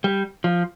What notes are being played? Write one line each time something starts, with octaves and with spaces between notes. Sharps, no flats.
G3
F3